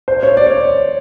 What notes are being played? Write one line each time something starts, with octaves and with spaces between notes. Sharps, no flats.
C5
C#5
D5
C#5